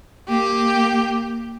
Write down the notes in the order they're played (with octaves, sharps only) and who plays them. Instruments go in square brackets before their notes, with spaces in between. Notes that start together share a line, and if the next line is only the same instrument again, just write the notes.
[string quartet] A#3 G4